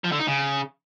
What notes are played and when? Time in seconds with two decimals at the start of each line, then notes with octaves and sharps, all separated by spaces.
0.04 F3
0.12 D3
0.19 D#4
0.27 C#3